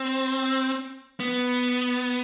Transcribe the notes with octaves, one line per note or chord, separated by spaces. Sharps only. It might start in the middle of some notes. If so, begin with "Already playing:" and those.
Already playing: C4
B3